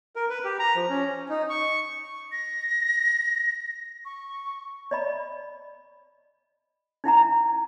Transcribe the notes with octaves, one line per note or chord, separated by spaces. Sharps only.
A#4
B4
G4
A#5
F3
C#4
D#4
C#6
A#6
C#6
D5 D#5 B5
D#4 E4 F#5 A#5